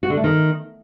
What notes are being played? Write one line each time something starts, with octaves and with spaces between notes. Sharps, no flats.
F#4
D3
A3
D#3